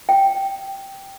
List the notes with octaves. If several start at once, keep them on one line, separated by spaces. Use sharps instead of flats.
G5